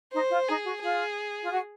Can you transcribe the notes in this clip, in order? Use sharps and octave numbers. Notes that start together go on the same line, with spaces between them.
D#4 C5
F4
D#4 G#4
F#4
F4 G#4
F4
F#4